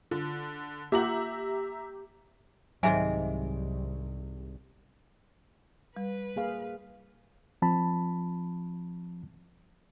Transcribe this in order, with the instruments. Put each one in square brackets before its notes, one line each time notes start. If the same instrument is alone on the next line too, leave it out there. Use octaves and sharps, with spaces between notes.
[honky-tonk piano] D3 [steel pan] F4
[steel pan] A#3 F4 F#5 [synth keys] G4 [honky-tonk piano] E5 A#5 F#7
[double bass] C2 [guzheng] G#2 C3 D#3 [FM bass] F#3 [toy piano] G#4 E5 G#5
[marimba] G3 [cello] B4
[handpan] A#3 G#4 F5
[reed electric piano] F3 C4 A5 B5